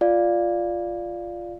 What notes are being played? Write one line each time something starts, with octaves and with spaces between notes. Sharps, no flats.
F4 D5 F5